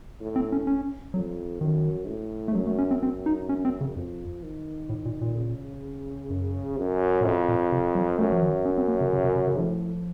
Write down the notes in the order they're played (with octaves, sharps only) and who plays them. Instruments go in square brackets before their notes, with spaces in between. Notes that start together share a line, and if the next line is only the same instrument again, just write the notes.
[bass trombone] A2
[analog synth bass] C4
C#4
C#4
[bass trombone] F2 [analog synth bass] F#3
[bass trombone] F#2 [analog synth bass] D#3
[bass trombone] A2
[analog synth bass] A3
[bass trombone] F#2 [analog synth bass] F#3
[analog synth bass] A3
C#4
C4
[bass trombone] F#2 [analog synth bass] C4
[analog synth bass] D#4
C#4
C4
C#3
[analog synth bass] F2 [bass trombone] F3
[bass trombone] D#3
[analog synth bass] A2
A#2
A#2
[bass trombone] C#3
[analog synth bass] F#2
[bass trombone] F#2
[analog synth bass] A#2
[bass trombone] F2 [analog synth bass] A2
[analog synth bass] A#2
C3
F#3
[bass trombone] F#2 [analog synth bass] A3
[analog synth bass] F3
D#3
C#4
C4
A#3
C#3
C#3
C3
C3
C#3
[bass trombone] A2 [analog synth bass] F3